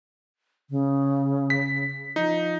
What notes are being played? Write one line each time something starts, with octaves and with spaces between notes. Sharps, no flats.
C#3
B6
F3 D#4